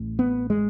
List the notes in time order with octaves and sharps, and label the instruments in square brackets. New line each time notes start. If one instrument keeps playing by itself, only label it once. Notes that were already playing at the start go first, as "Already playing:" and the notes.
Already playing: [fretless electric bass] A1 A2
B3
G#3